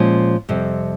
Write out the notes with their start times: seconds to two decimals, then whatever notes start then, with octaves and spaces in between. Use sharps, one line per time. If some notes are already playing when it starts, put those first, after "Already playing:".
Already playing: A#2 F3 G#3 C#4
0.49 F2 C3 G3